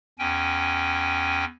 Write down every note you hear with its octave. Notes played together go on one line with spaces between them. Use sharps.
E2 C#4 G5 G#5